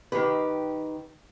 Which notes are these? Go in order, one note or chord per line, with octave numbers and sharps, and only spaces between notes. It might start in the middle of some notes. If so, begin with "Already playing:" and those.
D#3 D#4 G4 B4